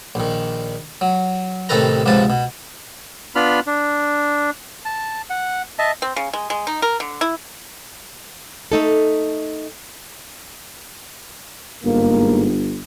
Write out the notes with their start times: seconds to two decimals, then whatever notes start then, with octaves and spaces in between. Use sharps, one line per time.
0.15 A#1 D#3
1.01 F#3
1.69 A1 C3 D#3 A4 B4 A#5
2.06 C#2 G#2 C3 F3 B4 A5
2.30 B2
3.35 B3 D4 F4 B5 F6
3.67 D4
4.85 A5
5.30 F#5
5.79 D#5 E5 A5
6.02 C4
6.16 C#3
6.34 G#3
6.50 G#3
6.67 D#4
6.82 A#4
7.00 D3
7.21 E4
8.72 A3 D#4 A4
11.84 G1 G#2 A#3